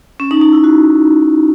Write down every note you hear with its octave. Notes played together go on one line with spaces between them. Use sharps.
C#4
D#4
D#4
E4
F#4